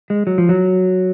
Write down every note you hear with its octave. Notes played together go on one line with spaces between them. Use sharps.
G#3
F#3
F3
F#3